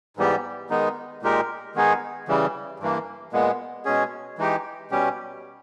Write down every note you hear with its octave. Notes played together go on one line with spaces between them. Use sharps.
G#2 E3 G3 B3 G4
D#3 G#3 B3 D#4
A#2 G#3 D#4 G4 A#4
D#3 G#3 B3 D#4 G#4
C#3 E3 G3
G2 E3 A#3
A#2 G#3 B3
B2 G#3 C#4 G#4
E3 G#3 D#4 G4
B2 G3 C#4 G4